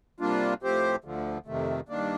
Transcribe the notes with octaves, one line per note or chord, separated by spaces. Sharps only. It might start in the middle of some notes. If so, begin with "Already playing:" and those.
C3 G3 A#3 D4 F4
A2 F3 C4 G4 C5
D2 D3 F3
F2 C3 D#3 A3
G2 D#3 A#3 D4